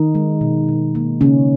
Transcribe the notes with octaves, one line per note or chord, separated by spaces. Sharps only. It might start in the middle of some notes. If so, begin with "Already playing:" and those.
Already playing: D#3 D#4
G#3
B2
B2
A#3
C#3 A#3 C#4